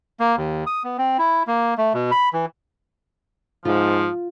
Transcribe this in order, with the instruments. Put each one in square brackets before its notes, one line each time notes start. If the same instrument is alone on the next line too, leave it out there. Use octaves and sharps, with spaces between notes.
[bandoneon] A#3
D#2
D#6
B3
C4
E4
A#3
A3
B2
B5
E3
[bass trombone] G#2 [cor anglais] F3 [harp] F4